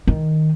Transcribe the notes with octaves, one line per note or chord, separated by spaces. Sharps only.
D#3